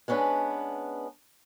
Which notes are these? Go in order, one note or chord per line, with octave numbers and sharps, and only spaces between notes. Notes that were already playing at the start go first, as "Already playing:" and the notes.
G#3 B3 C#4 D4 B4